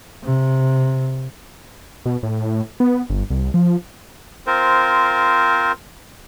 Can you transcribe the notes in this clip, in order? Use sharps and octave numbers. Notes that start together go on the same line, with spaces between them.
C3
B2
A2
B3
G1
C2
F3
C4 F4 A#4 C5